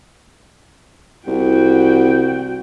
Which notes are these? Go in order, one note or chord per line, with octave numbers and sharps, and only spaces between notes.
C2 F#4 G5